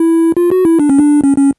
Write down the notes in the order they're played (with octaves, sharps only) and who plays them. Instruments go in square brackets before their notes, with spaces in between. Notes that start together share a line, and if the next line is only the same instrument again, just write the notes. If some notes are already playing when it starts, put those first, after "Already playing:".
Already playing: [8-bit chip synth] E4
F4
F#4
E4
D4
C#4
D4
C#4
C#4